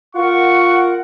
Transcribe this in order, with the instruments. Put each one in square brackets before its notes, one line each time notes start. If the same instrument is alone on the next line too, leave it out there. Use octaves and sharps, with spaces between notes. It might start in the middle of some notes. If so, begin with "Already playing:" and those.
[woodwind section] A#3 A#4 F#5 [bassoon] F4 [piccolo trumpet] C#6